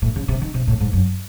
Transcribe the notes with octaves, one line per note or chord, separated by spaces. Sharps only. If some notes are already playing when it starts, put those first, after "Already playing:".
A2
C#3
C3
D#3
C3
A2
G#2
F#2